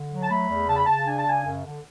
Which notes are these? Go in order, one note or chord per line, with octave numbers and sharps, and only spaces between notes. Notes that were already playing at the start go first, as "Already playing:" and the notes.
Already playing: D3
F#3
A5
A3 B5
E2
C#3 A5
B5
C#3 A5
D4 G#5
A5
C#3 G#5
F#2
D3